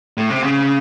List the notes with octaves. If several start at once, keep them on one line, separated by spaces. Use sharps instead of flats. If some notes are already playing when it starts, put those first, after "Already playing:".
A2
C3
C#3